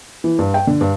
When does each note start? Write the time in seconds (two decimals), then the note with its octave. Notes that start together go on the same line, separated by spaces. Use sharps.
0.24 E3
0.39 G2
0.54 G5
0.67 D3
0.81 G2